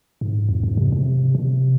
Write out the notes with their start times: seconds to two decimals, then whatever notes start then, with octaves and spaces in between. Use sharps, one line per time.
0.21 G#2
0.49 F2
0.63 G#2
0.77 C3
0.92 C3
1.35 C3